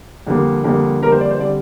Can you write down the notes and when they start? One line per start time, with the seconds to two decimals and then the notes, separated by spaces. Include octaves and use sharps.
0.27 F2 D3 G3 A#3
0.64 F2 D3 G3 A#3
1.02 F2 D3 G3 A#3 A#4
1.12 C5
1.21 D5
1.30 C5
1.39 D3 G3 C4 D5